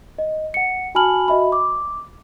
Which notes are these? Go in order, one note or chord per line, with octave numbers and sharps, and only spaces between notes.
D#5
F#5 C#7
F#4 G#5 A5 B5 F6 F#7
F#4 D#5 E5 B5
D6